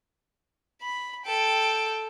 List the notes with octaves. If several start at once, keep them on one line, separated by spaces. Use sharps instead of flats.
B5
A4 G5